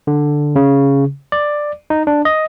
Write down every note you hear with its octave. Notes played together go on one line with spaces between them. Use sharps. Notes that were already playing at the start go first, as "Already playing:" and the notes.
D3
C#3
D5
D#4
D4
D#5